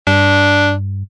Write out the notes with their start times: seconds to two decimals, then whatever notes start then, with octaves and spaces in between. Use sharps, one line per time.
0.07 G2 D4